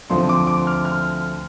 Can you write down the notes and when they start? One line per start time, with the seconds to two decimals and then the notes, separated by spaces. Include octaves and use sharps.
0.10 D2 D3 F3 C4 C6
0.29 D6
0.47 D6
0.67 F6
0.85 F6